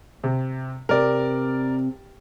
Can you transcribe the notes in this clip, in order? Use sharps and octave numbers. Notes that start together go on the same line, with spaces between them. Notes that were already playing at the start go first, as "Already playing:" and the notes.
C3
C3 A#4 D5